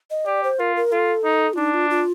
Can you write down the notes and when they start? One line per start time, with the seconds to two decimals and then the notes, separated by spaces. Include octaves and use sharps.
0.11 D#5
0.26 G4 D5
0.44 C5
0.59 F4 A#4
0.76 A#4
0.92 F4 A4
1.25 D#4
1.53 F4
1.57 D4 D#4
1.74 F4
1.90 F4